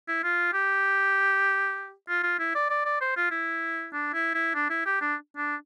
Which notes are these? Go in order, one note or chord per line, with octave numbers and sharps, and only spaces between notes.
E4
F4
G4
F4
F4
E4
D5
D5
D5
C5
F4
E4
D4
E4
E4
D4
E4
G4
D4
D4